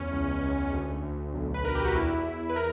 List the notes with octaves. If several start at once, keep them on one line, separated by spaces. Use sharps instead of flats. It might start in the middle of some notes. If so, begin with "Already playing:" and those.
Already playing: E2 C#4
C#2
C#2
D2
D2
B1
B4
B1 A#4
G4
F#4
E2 E4
E2
B4
A#4